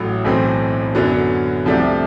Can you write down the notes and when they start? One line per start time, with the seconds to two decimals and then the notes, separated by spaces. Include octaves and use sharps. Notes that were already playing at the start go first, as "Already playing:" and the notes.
Already playing: A1 A2 F#3
0.24 B1 A2 E3 A3 C4
0.95 F#2 D3 F#3 B3
1.65 C2 C3 F3 A3 D4